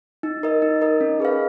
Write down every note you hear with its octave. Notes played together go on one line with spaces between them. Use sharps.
D#4
A#4 D#5
D#4
A#4 D#5
C#4
G#4 B4 F5